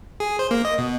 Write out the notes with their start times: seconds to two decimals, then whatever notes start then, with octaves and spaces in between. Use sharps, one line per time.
0.20 G#4
0.39 C5
0.51 A#3
0.65 D#5
0.78 B2